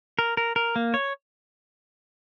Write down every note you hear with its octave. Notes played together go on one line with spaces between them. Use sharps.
A#4
A#4
A#4
A#3
C#5